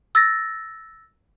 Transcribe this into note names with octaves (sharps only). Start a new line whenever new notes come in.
E6 A6 A#6